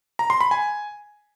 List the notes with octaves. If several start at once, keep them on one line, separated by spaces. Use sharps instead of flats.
A#5
C6
B5
G#5